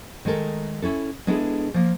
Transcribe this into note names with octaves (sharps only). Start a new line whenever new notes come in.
D#3 G#3 A3 A4 A#4
C#4 E4 A4
G#3 B3 D4 E4 G#4 A4
F3 A#3